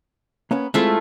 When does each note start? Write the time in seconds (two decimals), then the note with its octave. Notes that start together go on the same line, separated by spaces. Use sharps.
0.51 A#3 B3 C#4
0.74 G#3 A3 C4 E4 F4 C6